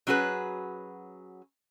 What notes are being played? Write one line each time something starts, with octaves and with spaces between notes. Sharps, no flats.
F#3 C#4 F#4 G#4 B4